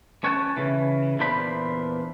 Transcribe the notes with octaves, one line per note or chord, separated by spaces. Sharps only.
C#4 C#5 F#5 G5 A5
C#3 E3
E2 A#2 D4 C5 B5